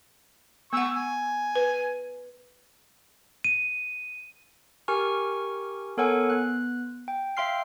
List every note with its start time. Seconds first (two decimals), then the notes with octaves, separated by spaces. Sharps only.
0.73 B3 F#5 C#6 E6
0.95 G#5
1.56 B4
3.44 D#7
4.88 G4 A#4 G#5 C#6 F6
5.97 B3 A4 A#4 C#5 F#5 G#5
6.30 B3 F#6
7.08 G5
7.37 E5 F5 G5 C6 F6 C7